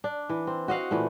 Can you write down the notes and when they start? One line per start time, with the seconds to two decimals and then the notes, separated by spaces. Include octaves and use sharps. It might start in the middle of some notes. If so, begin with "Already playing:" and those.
0.04 D4
0.29 E3
0.47 C4
0.68 F#4 D#5 F5 F#5
0.91 A#2 E3 A3